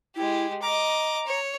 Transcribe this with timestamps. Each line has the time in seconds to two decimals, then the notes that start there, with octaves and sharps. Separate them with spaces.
0.16 G#3 E4 G4
0.62 D#5 A#5 D6
1.27 C#5